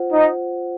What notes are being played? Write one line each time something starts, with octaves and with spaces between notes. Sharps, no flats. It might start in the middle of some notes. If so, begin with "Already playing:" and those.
Already playing: F4 C5 F#5
D#4